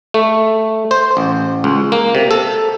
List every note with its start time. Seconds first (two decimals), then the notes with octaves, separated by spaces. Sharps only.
0.14 A3
0.91 C5
1.17 A1
1.64 C#2
1.92 A#3
2.15 C3
2.31 A4